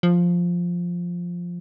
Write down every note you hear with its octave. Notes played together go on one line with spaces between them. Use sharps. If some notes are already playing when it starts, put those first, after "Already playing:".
F3